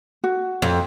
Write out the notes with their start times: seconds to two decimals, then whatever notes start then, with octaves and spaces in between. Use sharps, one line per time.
0.24 F#4
0.62 F2